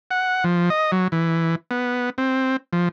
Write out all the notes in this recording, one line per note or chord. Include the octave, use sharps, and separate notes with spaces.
F#5
F3
D#5
F#3
E3
B3
C4
F3